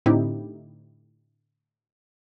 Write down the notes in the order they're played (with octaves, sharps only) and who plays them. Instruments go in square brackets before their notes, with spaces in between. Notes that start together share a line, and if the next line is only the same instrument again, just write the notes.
[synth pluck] A2 D3 C4 D#4 E4 G4